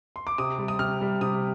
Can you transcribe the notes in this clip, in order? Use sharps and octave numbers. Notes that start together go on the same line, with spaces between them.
C6
D6
C3 D#6
G3
D#6
C3 F6
G3
C3 D#6